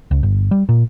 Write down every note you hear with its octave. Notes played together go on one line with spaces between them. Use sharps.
C#2
G1
G3
A#2